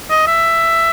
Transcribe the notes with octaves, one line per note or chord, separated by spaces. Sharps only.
D#5
E5